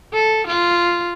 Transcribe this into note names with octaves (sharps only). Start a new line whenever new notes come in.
A4
F4